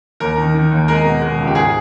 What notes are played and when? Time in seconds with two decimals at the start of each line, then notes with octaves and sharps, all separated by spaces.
0.20 D#2 A#4
0.37 D#3
0.54 D#3
0.71 D#2
0.88 G#3 A#4
1.05 B2
1.21 G#3
1.38 C#2
1.47 G4
1.55 G#2 G#4